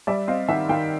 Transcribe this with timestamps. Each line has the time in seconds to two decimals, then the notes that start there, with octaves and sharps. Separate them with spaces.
0.07 G3 D5 E5
0.27 C4 D#5 F5
0.49 D#3 E5 F#5
0.69 D#3 F5 G5